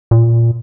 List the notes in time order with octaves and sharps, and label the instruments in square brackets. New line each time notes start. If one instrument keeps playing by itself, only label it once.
[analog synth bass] A#2